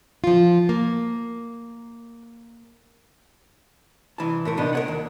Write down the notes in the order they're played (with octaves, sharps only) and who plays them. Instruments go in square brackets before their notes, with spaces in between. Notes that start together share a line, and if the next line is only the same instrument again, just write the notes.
[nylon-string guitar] F3 F4
A#3
[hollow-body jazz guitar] C2 E3 A5
A2 A3 A#4
C3 B3 D4 D#4
A#4 C#5 F#5
D#2